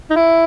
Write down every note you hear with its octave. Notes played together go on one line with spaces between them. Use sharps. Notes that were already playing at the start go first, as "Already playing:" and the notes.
D#4
E4